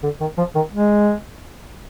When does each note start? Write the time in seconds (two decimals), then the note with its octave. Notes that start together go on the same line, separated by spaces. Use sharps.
0.03 D3
0.21 D#3
0.37 F3
0.55 D#3
0.72 G#3